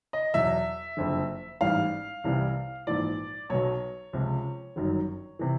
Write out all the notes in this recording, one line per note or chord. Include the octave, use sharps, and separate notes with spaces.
D#5
E2 B2 F#3 E5
F#1 F2 D3
A1 G#2 E3 G3 F5
C2 C3 E3 G3
A#1 G#2 E3 D5
B1 B2 F#3 C#5
C#2 C3 F3
G1 F#2 D#3 F#3
C3 E3